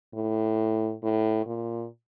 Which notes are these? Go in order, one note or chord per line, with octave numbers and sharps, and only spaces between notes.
A2
A2
A#2